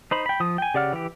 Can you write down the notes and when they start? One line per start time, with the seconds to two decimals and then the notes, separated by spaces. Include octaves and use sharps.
0.11 D#4 C5 B5
0.26 G5 B5
0.40 F3 D#6
0.58 G5 G#5
0.74 C#3 G4 D5 F#5 F6
0.93 E3 G4